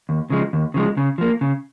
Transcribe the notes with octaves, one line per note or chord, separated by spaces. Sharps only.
D#2
C#3 F3 G#3
D#2
C#3 F3 G#3
C#3
F3 A#3
C#3